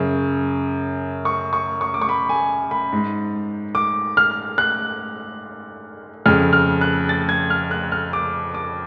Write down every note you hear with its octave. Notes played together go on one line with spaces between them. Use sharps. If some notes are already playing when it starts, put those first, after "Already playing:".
Already playing: F#2 C#3
C#6
C#6
C#6
D6
C#6
B5
G#5
B5
G#2
D6
F6
F#6
F2 C#3 F6
F6
F#6
A6
G#6
F6
F#6
F6
D6
D6